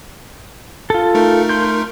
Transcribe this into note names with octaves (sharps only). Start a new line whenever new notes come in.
F4 A4
A3 D#4 A#4
C6 G6